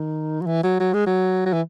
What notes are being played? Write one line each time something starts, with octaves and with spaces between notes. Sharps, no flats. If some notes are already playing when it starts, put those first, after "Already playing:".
Already playing: D#3
F#3
E3
F#3
F#3
G#3
F#3
F#3
E3